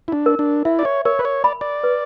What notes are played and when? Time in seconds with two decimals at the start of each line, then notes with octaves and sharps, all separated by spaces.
0.08 E4
0.12 D4
0.26 A#4
0.39 D4
0.65 E4 E5
0.79 D5
0.85 C#5
1.05 A#4 C#5
1.19 B4
1.25 C#5
1.44 D5 B5
1.61 D5
1.83 B4